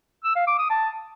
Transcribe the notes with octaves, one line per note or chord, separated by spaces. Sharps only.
E6
F5
D6
D#6
A5